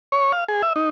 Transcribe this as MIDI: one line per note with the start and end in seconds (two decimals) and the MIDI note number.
0.12 0.32 73
0.32 0.44 77
0.48 0.62 68
0.63 0.73 76
0.76 0.90 63